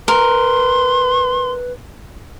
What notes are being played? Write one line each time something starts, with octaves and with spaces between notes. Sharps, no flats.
A#4 B4 C6